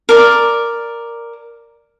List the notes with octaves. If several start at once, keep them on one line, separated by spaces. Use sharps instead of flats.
A#4 D5